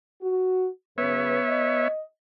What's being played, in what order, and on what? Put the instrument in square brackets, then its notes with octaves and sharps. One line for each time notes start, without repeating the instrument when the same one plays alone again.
[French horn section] F#4
[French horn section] F#2 C#3 B4 [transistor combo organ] B3 C#5 E5
[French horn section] D#5